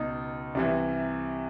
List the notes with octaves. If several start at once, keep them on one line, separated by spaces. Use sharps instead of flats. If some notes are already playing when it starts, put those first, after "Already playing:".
Already playing: C#2 B2 D#4
C2 C3 E3